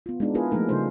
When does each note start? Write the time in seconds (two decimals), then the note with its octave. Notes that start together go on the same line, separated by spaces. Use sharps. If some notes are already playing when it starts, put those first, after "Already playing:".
0.06 B3 F4
0.20 G#3 B3 D4 D#4
0.35 B3 E4 F4 G#4 A#4 B4
0.51 F3 A3 A#3 D#4 A#4
0.69 C#3 G3 D#4 G#4 C5